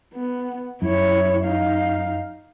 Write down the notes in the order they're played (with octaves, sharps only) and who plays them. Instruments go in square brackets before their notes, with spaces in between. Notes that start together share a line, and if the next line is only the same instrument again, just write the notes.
[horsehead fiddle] B3
[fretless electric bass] F#2 [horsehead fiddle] E4 C#5
[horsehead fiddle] D#4 F5